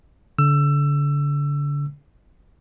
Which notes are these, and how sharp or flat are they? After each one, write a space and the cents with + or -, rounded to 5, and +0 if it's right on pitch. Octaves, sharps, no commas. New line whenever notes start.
D3 -35 E6 +20